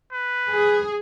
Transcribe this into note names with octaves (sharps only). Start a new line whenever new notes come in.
B4
G#4